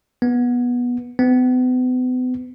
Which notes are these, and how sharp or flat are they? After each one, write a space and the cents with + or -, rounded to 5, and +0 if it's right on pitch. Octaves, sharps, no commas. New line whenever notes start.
B3 -15
B3 +40